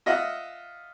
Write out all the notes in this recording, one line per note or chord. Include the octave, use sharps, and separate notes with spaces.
F4 D#5 E5 F#5 D#6